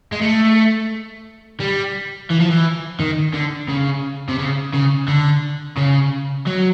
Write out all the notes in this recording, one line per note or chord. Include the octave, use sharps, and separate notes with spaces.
G#3
A3
G3
E3
F3
E3
D#3
D3
C#3
C3
C#3
C#3
D3
C#3
F#3